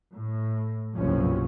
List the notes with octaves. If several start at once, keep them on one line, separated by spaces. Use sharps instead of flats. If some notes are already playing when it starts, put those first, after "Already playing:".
A2
F#1 C2 G2 B2 F3 C#4